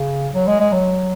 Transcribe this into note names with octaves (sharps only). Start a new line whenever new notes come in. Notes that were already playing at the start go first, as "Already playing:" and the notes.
Already playing: C#3
F#3
G#3
G#3
F#3